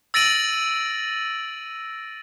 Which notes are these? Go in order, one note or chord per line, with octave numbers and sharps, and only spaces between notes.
E6 A6 A#6 D7 D#7 F#7